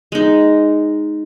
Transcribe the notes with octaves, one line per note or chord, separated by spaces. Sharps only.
G#3 D#4